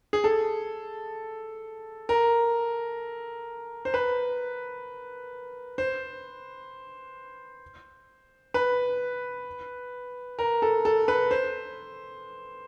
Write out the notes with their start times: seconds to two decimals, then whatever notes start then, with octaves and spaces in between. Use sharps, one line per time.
0.13 G#4
0.24 A4
2.09 A#4
3.85 C5
3.94 B4
5.78 C5
8.54 B4
10.39 A#4
10.62 A4
10.85 A4
11.08 B4
11.31 C5